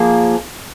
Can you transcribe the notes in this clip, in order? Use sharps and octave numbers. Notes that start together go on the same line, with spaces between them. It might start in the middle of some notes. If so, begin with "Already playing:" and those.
Already playing: F3 A#3 G#4